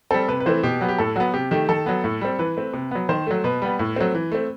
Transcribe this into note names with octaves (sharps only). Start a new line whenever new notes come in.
G3 C4 A4
C3 B4
B4
E3 A3 C4 C5
B2 G4
F#3 B3
G4
A2 A4
F#3 B3 F#4
C3 G4
D#3 A3 G4
D#3 A4
F#3 B3
A2
G3 C4
E3 B4
A3 C4
C3
F#3 B3
D#3 C5
F#3 A3
B2 B4
G3 B3
A2
F#3 A3 C4
E3
A3 C4